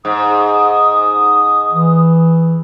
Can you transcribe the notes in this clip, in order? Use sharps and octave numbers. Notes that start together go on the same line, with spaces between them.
G#2 D#6
E3